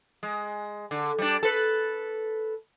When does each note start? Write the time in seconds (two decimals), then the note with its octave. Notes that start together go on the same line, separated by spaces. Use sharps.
0.23 G#3
0.91 D3
1.18 G3 D4
1.43 A4 B4